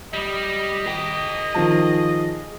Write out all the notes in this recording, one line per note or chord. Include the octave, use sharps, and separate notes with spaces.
G3 D#5
G#4 G5
D#3 F3 A5